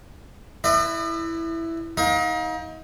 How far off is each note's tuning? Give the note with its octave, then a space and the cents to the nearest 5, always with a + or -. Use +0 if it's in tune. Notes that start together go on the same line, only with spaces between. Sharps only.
E4 +0 B4 +20 D#5 -45
D#4 +35 A#4 +35 F5 +35